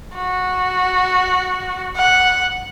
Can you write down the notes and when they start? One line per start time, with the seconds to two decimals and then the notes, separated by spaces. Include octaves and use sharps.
0.16 F#4
1.97 F#5